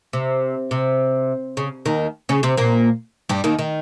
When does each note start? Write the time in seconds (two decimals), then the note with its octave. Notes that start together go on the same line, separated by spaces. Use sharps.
0.13 C3
0.71 C3
1.57 C#3
1.86 D#2 D#3
2.29 C#3 C#4
2.43 C3 C4
2.57 A#2 A#3
3.29 G2 G3
3.44 D#2 D#3
3.59 D#3